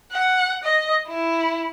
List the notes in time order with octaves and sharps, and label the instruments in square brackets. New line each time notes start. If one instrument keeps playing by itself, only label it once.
[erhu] F#5
D#5
E4